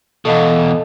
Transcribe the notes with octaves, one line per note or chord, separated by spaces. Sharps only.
E2 B2 A4 D#5 F5